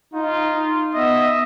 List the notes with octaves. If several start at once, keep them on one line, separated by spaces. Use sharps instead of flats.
D#4 F4
B3 D#5 E5